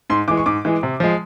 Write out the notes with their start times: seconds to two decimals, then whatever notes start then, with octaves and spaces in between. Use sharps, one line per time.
0.10 G#2 C6
0.28 E3 G#3 D6
0.37 C#6
0.46 G#2 D6
0.65 E3 G#3
0.83 C3
1.00 F3 G#3